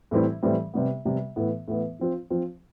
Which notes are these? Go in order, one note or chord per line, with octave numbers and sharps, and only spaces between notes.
A2 E3 G3 C4 E4
A2 E3 G3 C4 E4
C3 G3 B3
C3 G3 B3
A2 E3 B3
A2 E3 B3
F3 C4 F4
F3 C4 F4